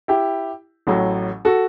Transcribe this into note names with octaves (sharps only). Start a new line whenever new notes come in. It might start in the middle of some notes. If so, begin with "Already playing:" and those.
E4 G4
A1 A2 F#3
F#4 A4